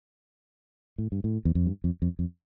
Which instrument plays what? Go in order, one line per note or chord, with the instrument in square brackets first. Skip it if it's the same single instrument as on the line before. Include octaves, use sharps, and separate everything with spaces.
[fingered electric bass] A2
G2
A2
E2
F2
G2
F2
F2
F2